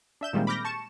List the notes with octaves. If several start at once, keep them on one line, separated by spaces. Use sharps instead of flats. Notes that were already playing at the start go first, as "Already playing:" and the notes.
D4 E5 G6 E7
A#2 D#3 G3 G#3 A#3 C4
B5 D6 F6 G6 A#6
A5 C#6 C#7 E7